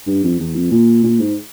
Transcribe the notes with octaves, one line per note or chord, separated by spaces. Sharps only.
G2
F2
E2
F2
A#2
A#2
G#2